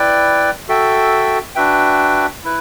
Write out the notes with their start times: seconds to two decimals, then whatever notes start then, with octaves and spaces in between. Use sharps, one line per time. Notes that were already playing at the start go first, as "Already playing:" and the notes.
Already playing: E4 B4 D5 G5
0.68 F#4 A4 E5 G5
1.55 D4 F#4 B4 E5 G5
2.44 E4 B4